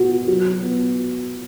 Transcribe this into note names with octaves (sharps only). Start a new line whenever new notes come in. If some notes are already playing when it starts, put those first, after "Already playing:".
Already playing: B3 F#4
F#3
B3